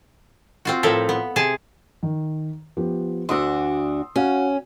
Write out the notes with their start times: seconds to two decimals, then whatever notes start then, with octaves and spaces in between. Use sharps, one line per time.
0.65 C4 F4 F#4
0.83 A2 F3 A4 A#4 E5
1.09 B3
1.36 C3 G#4 G#5 A5
2.03 D#3
2.77 F3 B3 G4
3.29 D2 D4 F#4 C6 D#6 E6
4.16 C#4 F#4 F5 F#5